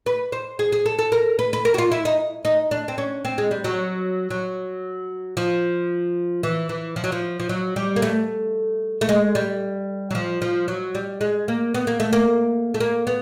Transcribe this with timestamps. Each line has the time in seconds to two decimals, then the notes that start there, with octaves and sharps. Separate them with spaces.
0.06 B4
0.32 C5
0.59 G#4
0.72 G#4
0.86 A4
0.99 A4
1.12 A#4
1.39 B4
1.53 B4
1.65 A#4
1.74 F#4
1.78 F4
1.92 E4
2.05 D#4
2.45 D#4
2.71 D4
2.88 C4
2.98 C#4
3.25 C4
3.38 G#3
3.51 G3
3.64 F#3
4.31 F#3
5.37 F3
6.43 E3
6.69 E3
6.96 F3
7.04 F#3
7.12 F3
7.40 F3
7.49 F#3
7.76 G3
7.96 A#3
8.02 A3
9.01 A3
9.09 G#3
9.35 G3
10.11 F#3
10.15 F3
10.42 F3
10.68 F#3
10.95 G3
11.21 G#3
11.48 A#3
11.74 B3
11.87 A#3
12.00 A3
12.13 A#3
12.74 A3
12.80 A#3
13.07 B3